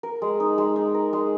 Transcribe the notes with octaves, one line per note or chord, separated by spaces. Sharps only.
A#4
G#3
D#4
G#3
D#4
A#4
G#3